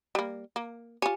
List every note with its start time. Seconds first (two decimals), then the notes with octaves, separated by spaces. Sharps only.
0.15 G3 A#3
0.56 A#3
1.02 F4 G4 C#5 G#5 C#7